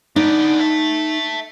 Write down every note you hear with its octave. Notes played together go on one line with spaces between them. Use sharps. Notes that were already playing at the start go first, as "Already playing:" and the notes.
B3 D4 D#4
E5 A5